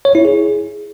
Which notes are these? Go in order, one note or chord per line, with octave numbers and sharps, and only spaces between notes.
C#5
E4
G#4